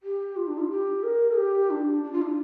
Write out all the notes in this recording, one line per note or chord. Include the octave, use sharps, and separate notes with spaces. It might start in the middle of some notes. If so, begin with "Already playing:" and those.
G4
F4
D4
F4
G4
A#4
G4
D4
D4
F4
D4